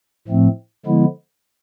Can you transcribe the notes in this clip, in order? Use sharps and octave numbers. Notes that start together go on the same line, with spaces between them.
A2 F3 A3 C4
D3 F3 G#3 B3 E4